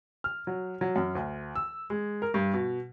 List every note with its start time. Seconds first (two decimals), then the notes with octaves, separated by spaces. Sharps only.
0.24 F6
0.47 F#3
0.81 F#3
0.96 F#2
1.15 D2
1.56 E6
1.90 G#3
2.22 A#4
2.34 G2
2.54 B2